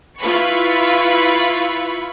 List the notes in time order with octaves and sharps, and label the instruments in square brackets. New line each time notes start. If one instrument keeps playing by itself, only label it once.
[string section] E4 F4 B4 B5 C#6